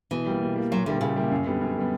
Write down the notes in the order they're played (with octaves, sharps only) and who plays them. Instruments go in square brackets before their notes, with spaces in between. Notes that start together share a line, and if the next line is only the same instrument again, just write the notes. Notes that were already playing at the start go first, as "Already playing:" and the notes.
[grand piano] B2 [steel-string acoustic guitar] E3
[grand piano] G3 A#3
B2
G3 A#3
[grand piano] A#2 [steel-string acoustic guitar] F#3
[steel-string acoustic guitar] D3 [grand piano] G3 A#3 E4
[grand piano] A#2 [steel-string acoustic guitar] C#3
[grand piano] G3 A#3 E4
F#2
D3 G3 B3
F#2
D3 G3 B3